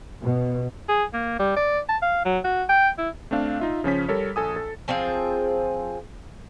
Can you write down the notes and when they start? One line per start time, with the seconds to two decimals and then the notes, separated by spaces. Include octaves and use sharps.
0.21 B2
0.89 G#4
1.13 A#3
1.39 G3
1.57 D5
1.89 A5
2.02 F5
2.25 F#3
2.44 F#4
2.69 G5
2.98 E4
3.31 A3 C4 D4 F5
3.60 D#4 F4 E5
3.84 C#3 F3 C#4 B6
4.08 G3 A4 A#4 C#5
4.36 A#1 A4 G#5 D#6
4.56 A4
4.88 F3 C4 F4 G#4